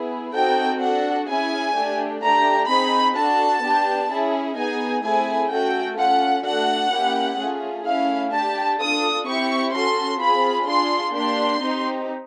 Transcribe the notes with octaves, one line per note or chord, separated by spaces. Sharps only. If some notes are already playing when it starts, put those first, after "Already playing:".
Already playing: B3 E4 G#4
C4 D#4 F#4 A4 G5
D4 F#4 A4 F#5
C#4 E4 G#4 G#5
A3 D4 G4
A3 D4 G4 A#5
C4 D#4 G#4 B5
D4 F#4 A4 A5
B3 D4 G4
C#4 E4 G#4
B3 D#4 G#4 G#5
A3 C4 E4 G#4 G#5
A3 C#4 F#4 A4 G5
C#4 F4 A4 F#5
A3 D4 F#4 A4 F#5
A#3 C#4 E4 G4
A3 C#4 F4 G#4
A3 C#4 E4 F5
D4 G4 A5
D4 F4 A4 D#6
C4 E4 G4 C#6
C#4 F#4 A4 C6
C4 F4 G#4 B5
D4 F4 G#4 C6
A#3 D4 G4 C6
C4 D#4 G4